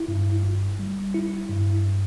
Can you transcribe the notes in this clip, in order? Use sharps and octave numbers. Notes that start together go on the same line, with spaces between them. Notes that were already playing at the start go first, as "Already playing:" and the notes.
Already playing: E4
G2
G1
G3
E4
G2